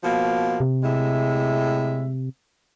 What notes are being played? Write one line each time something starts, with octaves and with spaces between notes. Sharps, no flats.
B2 F3 A#3
C3
A2 G#3 E5